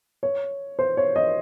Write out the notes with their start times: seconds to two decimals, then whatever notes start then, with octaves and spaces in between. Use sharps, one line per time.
0.23 C#5
0.79 C5
0.97 C#5
1.16 D#5